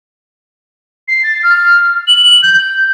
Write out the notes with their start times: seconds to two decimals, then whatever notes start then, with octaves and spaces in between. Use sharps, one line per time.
1.08 C7
1.23 A6
1.43 F6
2.07 F#7
2.43 G6